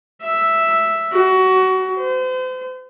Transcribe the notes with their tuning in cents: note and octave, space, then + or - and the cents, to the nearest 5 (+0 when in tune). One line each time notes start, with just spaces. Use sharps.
E5 +0
F#4 +25
C5 -40